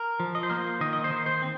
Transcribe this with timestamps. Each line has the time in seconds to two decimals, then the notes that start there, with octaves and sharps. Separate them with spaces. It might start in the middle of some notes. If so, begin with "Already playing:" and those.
Already playing: A#4
0.20 F3
0.35 D#5
0.43 C5
0.50 A#3 A#4
0.57 C5
0.81 D#3 D#5
0.93 D#5
1.04 C5
1.11 D#3
1.26 C5
1.42 C4